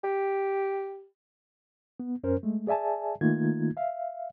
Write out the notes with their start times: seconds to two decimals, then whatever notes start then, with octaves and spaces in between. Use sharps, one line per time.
0.04 G4
2.00 B3
2.24 F#2 C#4 A#4 C5
2.43 G#3 A3
2.67 G#4 D5 E5 G#5 A5
3.21 D#3 A3 A#3 D#4 F4 G#6
3.77 E5 F5